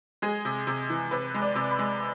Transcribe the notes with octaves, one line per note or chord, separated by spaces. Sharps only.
G#3 G#4
C3
C3
E3
C3 B4
G#3
D5
C3
B5
G#3